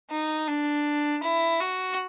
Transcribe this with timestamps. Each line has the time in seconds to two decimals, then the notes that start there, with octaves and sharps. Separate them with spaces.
0.11 D#4
0.48 D4
1.23 E4
1.61 F#4